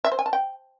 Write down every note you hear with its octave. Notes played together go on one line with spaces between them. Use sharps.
E5
C5
G#5
A5
G5